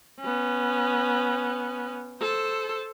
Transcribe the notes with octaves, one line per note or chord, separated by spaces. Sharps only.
B3 C#4
A4 C5